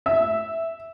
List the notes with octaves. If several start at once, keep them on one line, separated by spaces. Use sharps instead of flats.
E5